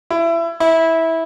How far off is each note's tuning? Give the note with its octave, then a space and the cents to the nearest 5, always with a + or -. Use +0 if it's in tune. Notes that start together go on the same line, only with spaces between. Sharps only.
E4 +25
E4 -15